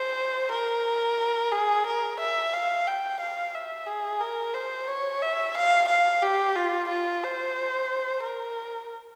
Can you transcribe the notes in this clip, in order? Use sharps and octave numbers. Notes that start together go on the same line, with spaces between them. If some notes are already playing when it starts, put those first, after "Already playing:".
Already playing: C5
A#4
G#4
A#4
E5
F5
G5
F5
E5
G#4
A#4
C5
C#5
E5
F5
F5
G4
F4
F4
C5
A#4